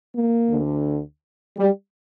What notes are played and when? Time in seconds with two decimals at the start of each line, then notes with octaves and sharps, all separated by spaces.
0.14 A#3
0.49 D2 D3
1.57 G3